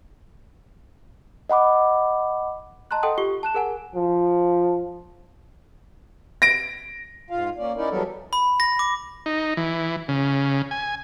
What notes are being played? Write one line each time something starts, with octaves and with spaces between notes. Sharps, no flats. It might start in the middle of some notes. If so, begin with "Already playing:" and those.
D#5 F#5 B5 D6
D#5 A5 A#5 C6 F#6
A4 D#5 F#5 G5 C6 D#6
F4 G4 C#6 G7
A5 F#6 E7
G#4 A#4 F#5 G#5
F3
A#6 D7
G#2 F4 F5
A#3 C#4 D5
C#4 D#4 E4 A#4 D5
E3 F#3 G3 B3 A4 A#4
B5
A#6
D6
D#4
E3
C#3
G#5